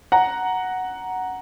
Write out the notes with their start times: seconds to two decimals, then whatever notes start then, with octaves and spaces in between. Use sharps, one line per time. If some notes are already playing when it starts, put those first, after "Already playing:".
0.12 F#5 A#5